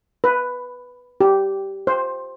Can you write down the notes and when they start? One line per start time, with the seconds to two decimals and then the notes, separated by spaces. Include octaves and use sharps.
0.24 B4
1.21 G4
1.87 C5